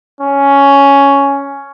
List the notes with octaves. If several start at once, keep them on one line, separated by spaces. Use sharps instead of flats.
C#4